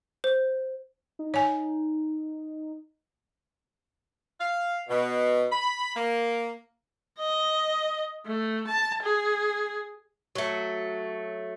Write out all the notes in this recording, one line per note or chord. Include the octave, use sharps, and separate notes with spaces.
C5
D#4
C#5 G#5
F5
B2
B5
A#3
D#5
A3
A5
G#4
F#3 A3